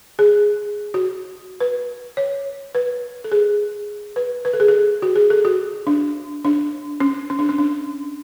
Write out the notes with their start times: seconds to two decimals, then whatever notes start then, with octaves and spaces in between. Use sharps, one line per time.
0.19 G#4
0.94 F#4
1.60 B4
2.17 C#5
2.75 B4
3.24 A4
3.32 G#4
4.16 B4
4.45 B4
4.53 A4
4.60 G#4
4.68 A4
5.02 F#4
5.16 G#4
5.30 A4
5.45 F#4
5.87 D4
6.45 D4
7.00 C#4
7.30 C#4
7.39 D4
7.49 C#4
7.58 D4